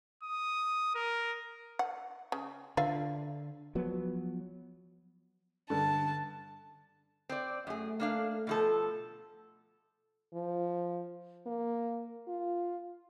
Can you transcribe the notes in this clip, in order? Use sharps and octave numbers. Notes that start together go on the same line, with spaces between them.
D#6
A#4
F#5
C#3
D3 F4 E5 F5
F3 F#3 B3
G2 D3 A5
C4 D5
F#2 A3 G#4
A#3 D4 F5
B2 F3 A4
F3
A#3
F4